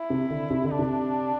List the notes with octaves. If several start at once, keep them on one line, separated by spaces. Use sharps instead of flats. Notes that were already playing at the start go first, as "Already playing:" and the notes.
Already playing: E4
C3
D3
C3
D3
D4
C3